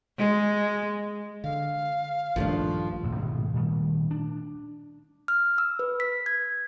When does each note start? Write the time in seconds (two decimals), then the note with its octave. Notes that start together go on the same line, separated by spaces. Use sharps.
0.19 G#3
1.44 D3 F5
2.36 A#1 G2 D#3 F3 A3 D4
3.03 D#1 A2
3.15 G#2 B2 D#3 G#3
3.54 A#2 D#3 G3 A3
4.11 D4
5.28 F6
5.58 E6
5.79 B4
6.00 B6
6.26 G#6